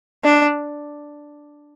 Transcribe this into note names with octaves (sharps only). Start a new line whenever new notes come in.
D4